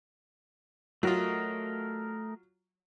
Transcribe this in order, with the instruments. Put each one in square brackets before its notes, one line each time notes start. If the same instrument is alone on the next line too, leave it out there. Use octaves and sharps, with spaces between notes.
[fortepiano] F#3 F4 [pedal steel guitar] A3 A#4 D#5